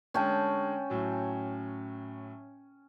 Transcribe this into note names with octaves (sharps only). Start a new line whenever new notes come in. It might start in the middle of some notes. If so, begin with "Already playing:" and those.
D3 G#3 C#4 G5 A5
A2 F#3